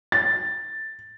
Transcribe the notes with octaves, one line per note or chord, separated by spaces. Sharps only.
A6